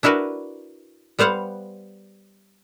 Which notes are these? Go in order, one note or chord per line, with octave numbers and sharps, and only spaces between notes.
D4 E4 F#4 A#4 B4
G3 B3 C5 F5 F#5